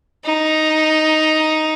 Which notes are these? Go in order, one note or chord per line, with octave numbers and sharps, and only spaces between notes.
D#4